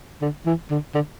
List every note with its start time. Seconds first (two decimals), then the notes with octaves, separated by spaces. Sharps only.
0.22 D3
0.46 E3
0.70 D3
0.94 D3